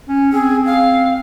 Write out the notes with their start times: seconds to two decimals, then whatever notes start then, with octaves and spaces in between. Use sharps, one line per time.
0.09 C#4
0.33 C4 G#4
0.66 F5